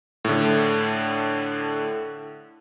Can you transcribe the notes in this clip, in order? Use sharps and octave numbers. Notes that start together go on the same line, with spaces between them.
A2 D3